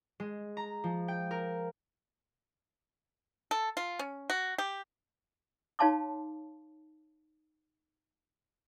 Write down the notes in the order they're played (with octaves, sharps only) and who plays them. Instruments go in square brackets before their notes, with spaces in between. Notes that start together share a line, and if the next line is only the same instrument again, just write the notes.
[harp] G#3
A#5
F3
G5
A#4
[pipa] A4
F4
C#4
F#4
G4
[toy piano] D#4 C#5 F5 A5 C6 D6